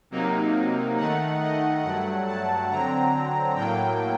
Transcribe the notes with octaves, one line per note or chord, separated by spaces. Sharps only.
C3 F#3 A#3 D#4
D#3 A3 D#4 F#5
D#5
G2 F#3 A3 F#5
A5
D3 F#3 C4 A#5
A2 F#3 A#3 G5